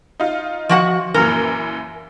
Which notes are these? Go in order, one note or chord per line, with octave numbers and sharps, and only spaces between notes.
D#4 F4
F3 F#4 F#5
F#2 A#2 E3 A#4